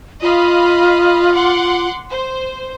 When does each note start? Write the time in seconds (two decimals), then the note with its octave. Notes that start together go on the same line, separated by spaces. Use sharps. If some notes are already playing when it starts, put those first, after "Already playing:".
0.22 F4 D#5 F5 B5
1.33 F#5 C6 D6
2.09 C5